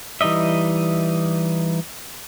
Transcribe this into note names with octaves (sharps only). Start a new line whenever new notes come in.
E3 G3 D#4 D#5 E5